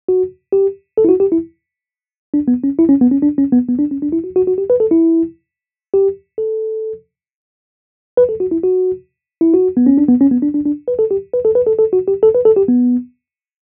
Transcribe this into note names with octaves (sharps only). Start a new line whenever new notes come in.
F#4
G4
A4
E4
F#4
G4
E4
D4
B3
C#4
E4
C#4
B3
C#4
D4
C#4
B3
B3
D4
C#4
D4
E4
F#4
F#4
F#4
G4
B4
A4
E4
G4
A4
B4
A4
F#4
E4
F#4
E4
F#4
B3
C#4
D4
B3
C#4
B3
D4
D4
D4
B4
A4
G4
B4
A4
B4
A4
A4
F#4
G4
A4
B4
A4
G4
B3